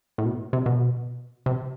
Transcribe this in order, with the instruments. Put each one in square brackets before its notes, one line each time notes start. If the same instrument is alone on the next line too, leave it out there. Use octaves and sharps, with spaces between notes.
[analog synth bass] A2
B2
C3
B2
C3